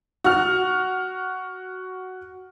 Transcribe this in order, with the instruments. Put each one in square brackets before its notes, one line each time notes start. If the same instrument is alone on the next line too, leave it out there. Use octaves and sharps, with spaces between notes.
[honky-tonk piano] F#4 F6